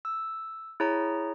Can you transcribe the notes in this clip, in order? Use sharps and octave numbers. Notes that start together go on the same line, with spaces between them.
E6
E4 G#4 C#5 A#5